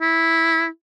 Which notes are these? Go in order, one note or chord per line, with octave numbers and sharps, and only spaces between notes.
E4